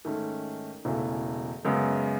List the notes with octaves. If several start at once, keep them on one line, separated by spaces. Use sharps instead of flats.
G#2 D#3 A3 C#4
E1 E2 C#3 E3 A3
F#2 C#3 G#3 B3